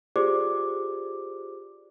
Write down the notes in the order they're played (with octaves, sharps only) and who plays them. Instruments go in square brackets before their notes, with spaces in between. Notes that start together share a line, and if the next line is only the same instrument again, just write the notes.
[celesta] F4 G4 G#4 C5 D5 D6